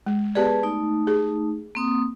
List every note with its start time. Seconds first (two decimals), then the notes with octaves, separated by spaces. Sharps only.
0.06 G#3
0.35 B3 G4 G#4 B4 D5 A5
0.63 A3 D#4
1.07 G4 G#4
1.75 A#3 C4 D#6